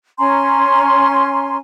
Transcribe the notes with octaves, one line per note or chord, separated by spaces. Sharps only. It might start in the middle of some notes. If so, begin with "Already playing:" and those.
C#4 G#5 A#5 C6